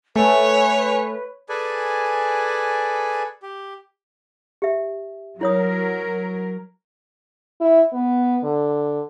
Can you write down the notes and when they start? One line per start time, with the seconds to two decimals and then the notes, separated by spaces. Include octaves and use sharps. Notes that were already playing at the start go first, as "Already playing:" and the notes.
0.16 A3 B4 C#5 G#5
1.49 G#4 A4 B4 D5 G#5
3.43 G4
4.62 G4 E5
5.41 F#3 E4 A#4 C#5 D#6
7.61 E4
7.93 B3
8.44 D3